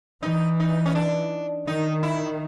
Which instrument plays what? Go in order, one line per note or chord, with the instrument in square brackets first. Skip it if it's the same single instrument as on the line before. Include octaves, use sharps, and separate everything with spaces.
[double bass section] E3 [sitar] D#4
[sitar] D#4
C#4
D4
[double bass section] D#3 [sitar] D#4
[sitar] E4